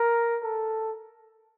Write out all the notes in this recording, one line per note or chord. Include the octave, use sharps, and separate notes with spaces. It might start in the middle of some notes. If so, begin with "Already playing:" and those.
Already playing: A#4
A4